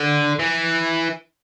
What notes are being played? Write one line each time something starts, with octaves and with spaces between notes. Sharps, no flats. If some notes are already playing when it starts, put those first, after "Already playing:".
Already playing: D3
E3